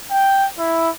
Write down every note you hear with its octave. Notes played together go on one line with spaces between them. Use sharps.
G5
E4